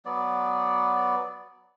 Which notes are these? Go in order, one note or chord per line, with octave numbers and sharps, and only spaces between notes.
F#3 B3 D5